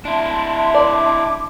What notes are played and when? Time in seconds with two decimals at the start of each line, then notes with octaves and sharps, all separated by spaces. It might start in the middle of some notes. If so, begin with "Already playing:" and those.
0.05 D4 E4 E5 A5 C6
0.74 D5 D6